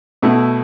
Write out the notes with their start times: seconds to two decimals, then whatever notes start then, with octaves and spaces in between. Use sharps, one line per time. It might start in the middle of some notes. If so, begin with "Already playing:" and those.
0.22 B2 A3 E4